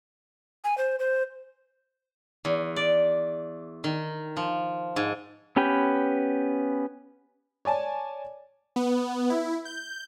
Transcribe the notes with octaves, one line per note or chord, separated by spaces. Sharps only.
G#5
C5
C5
E2
D5
D#3
F3
G#2
B3 C#4 G4 B4 G5
C#5 D5 G#5 A5
B3
E4
G6